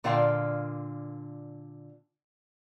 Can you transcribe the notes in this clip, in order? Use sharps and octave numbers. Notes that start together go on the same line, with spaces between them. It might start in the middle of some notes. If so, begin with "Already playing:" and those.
A#2 D3 F4 A#4 F5 G5